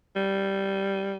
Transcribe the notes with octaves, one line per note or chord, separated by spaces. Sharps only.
G3